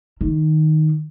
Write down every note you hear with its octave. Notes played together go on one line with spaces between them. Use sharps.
D#3